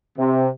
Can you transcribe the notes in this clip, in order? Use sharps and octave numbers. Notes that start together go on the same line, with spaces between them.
C3